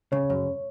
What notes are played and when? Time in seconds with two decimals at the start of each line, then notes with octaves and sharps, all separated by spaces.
0.12 C#3 C#5
0.30 F#2